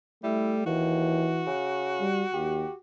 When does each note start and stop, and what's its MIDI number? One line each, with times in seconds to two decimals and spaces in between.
0.24 0.63 55
0.24 0.64 57
0.24 0.55 64
0.66 1.29 39
0.66 1.49 52
0.66 2.78 66
1.47 2.06 49
2.00 2.24 55
2.34 2.65 39
2.34 2.73 67